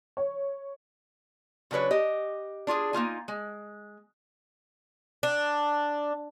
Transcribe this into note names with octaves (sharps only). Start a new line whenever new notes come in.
C#5
C#3 F#3 D4 B4 C#5
G4 D#5
D4 F4 G4 G#4
A#3 D#4 F4 G#5
G#3
D4